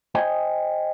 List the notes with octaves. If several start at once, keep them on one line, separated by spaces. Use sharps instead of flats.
C5 D#5 G5 G#5